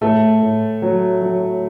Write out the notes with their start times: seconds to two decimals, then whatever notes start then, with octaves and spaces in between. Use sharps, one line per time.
0.01 A2 A3 A4
0.42 A2
0.82 F#3
1.22 F#3